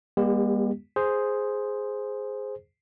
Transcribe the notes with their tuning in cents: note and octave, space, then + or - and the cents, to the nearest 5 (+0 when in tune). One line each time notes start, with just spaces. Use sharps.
G#3 -45 B3 -45 G4 +15
G#4 +0 C5 +0